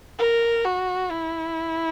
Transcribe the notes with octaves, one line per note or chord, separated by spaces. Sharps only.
A#4
F#4
E4